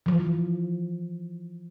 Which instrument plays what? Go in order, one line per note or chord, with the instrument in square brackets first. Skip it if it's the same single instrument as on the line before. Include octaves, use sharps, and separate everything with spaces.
[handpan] E3 F3